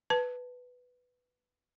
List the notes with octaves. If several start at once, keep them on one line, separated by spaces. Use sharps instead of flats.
B4 A5